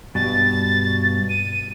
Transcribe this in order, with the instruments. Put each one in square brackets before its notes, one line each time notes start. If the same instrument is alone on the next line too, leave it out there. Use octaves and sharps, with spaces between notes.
[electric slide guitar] G2 B2 [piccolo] A6
[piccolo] D#7